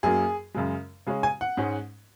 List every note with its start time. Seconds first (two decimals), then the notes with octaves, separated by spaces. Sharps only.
0.03 F#2 F#3 A#3 G#4
0.54 F#2 C#3 G#3
1.07 C#3 G#3 C#4
1.23 G#5
1.41 F#5
1.57 G#2 G#3 C#4